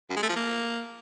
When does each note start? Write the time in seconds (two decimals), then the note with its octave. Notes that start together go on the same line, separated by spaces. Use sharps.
0.10 F#2
0.17 G#3
0.23 A3
0.29 F3
0.36 A#3